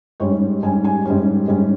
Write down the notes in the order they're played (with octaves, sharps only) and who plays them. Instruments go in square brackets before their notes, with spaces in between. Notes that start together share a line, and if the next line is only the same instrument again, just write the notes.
[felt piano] G#2 G3 C#4 C#5
G#2 G3 C#4 G#5
G#5
G#2 G3 C#4
G#2 G3 C#4